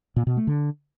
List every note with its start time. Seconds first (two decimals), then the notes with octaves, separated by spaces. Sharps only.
0.16 A#2
0.27 B2
0.37 A3
0.47 D3